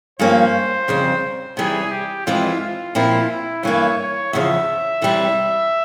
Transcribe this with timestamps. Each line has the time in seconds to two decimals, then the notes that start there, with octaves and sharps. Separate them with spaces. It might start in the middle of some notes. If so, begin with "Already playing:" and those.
0.19 G2 F3 A#3 C#4 C5
0.88 F2 C#3 G3 C4
1.57 C3 E3 G3 G#4
1.91 G4
2.26 F2 E3 G#3 C4 F4
2.60 F4
2.95 A#2 F3 C4 E4 F4 G4
3.30 E4
3.63 G2 E3 A#3 E4 C#5
3.98 C#5
4.33 E2 C#3 F3 E5
5.02 C3 E3 G3 C4